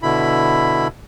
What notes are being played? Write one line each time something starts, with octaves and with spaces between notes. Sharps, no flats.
B2 D3 E4 B5